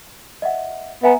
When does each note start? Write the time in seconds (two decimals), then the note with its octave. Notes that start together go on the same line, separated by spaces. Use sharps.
0.42 D#5 E5 F#5
1.03 B3 E5 G#5 A#5